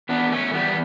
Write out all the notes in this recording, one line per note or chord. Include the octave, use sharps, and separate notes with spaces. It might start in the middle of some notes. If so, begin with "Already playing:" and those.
E2 B3 D4
A3 C#4
E2 G3 B3